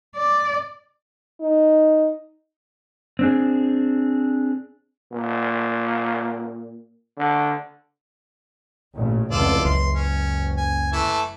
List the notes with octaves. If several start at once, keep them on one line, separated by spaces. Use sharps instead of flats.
D5
D#4
C4 D4 G#4
A#2
D3
A1 A#2 C#3
F1 C#2 E3 F4 A4 D5
F#1 C#2 C6
C#4
G#5
E3 A3 A5